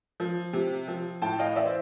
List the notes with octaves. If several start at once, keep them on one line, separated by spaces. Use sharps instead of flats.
F3
C3
F3
A2 G5 A5
D#5 F5
E3 D5 E5
C5